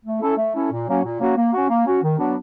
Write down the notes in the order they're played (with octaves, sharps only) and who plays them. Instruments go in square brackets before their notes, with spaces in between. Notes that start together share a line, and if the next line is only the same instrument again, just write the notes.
[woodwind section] A3
C#4 E4 A4
A3
C#4 E4 A4
A#2
F#3 A#3 C#4 F#4
A#2
F#3 A#3 C#4 F#4
A#3
C#4 F#4
A#3
C#4 F#4
D#3
F#3 B3 D4 F#4